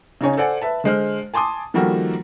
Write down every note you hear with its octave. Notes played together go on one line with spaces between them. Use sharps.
C#3 D#4 C#5 G#5
A4 C5 D5 F#5 G#5
B4 E5 A5
D3 G#3 C5 F6
G#5 A5 C6 D6 D#6
D#3 F3 G3 A#3 F#4 A4